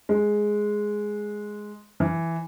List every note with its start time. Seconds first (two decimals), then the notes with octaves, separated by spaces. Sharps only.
0.09 G#3
2.00 E3